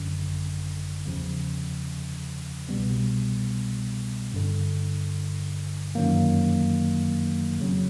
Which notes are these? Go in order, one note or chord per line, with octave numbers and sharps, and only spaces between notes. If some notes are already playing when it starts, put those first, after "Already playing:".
Already playing: G#1 F#2 D3
E2 C#3 F3
C2 B2 G3 B3
G1 G2 D3
G1 F#2 D#3 F#3 A#3
F2 C#3 F#3